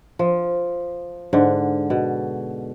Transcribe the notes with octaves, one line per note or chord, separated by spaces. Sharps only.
F3
G#2 D3
B2